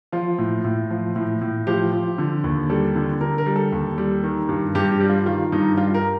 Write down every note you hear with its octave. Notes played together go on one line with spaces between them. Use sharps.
F3 F4
A2
A2
F3
A2
A2
F3 G4
F3
D3
D#2
G3 A4
D3
D3 A#4
A#4
G3
A4
D#2
G3
D#3
G2
G2 G4
G4
G3
F4
D#3 F4
G2 D#4
G3 F4
A#4